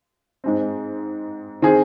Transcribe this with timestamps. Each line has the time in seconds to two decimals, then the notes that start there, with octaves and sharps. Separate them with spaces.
0.44 G#2 G#3 C4
1.62 D#3 C4 G#4